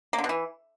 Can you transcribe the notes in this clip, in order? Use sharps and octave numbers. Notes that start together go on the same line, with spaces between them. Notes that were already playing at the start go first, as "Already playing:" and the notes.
A#3
D3
B2
E3